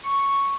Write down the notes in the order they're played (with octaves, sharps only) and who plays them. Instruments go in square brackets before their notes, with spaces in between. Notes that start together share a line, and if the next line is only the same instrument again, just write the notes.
[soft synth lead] C#6